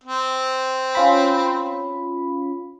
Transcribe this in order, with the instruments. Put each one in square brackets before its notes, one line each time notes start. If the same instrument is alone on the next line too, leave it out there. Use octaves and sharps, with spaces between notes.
[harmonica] C4
[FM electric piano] C#4 F4 B5